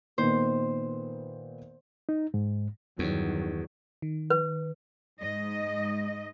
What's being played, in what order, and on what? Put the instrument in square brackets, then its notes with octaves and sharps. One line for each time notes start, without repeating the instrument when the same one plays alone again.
[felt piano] A#2 D#3 B3 [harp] C5
[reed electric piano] D#4
G#2
[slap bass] E2 [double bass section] G2 D#3 F#3
[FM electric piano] D#3
[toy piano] B4
[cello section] G#2 D#5